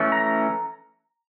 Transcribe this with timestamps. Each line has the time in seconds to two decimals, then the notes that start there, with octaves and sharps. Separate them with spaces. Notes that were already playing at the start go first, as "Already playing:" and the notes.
Already playing: E3 A3 C#4
0.12 A#5